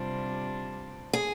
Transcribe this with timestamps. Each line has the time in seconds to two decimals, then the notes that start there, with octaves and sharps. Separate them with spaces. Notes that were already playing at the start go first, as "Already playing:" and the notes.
Already playing: C3 G3 D4 F4 C5
1.13 G#4